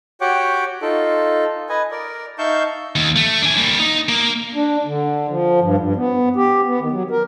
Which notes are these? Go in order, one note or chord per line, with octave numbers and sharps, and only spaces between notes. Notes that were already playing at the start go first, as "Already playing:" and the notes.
F#4 G4 C#5 F#5 G5 D6
D#4 F4 A4
B4 D#5 G#5
A#4 D5
D#4 E5 F5 A5 C#6 G6
D#2
A3
D4 G#5
G3 A#3
D#4
A#3
D4
D3
F3
G2
G2
B3
G4
B3
D#3
F#3
A#4